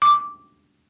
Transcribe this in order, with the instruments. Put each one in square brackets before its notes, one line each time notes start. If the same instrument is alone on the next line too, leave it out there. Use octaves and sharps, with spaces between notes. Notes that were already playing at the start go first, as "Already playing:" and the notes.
[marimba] D6